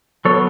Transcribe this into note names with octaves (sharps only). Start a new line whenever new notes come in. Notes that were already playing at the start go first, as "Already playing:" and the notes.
F#3 B3 A4 C#5